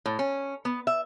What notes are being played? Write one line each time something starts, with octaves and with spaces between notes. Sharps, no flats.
A2
C#4
B3
E5